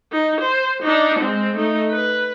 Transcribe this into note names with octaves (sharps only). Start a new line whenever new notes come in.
D#4
C5
D4 D#4
G#3 C4
A3 D#4
B4